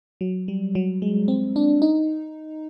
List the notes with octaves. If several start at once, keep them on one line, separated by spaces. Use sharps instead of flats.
F#3
G3
F#3
G#3
C4
D4
D#4